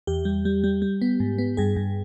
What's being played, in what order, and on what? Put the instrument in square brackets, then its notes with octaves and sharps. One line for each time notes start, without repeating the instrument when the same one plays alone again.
[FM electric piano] E2 G4
G3
G3
G3
G3
B3
G#2
B3
G2 G#4
G2